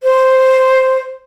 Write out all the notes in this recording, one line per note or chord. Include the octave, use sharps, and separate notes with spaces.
C5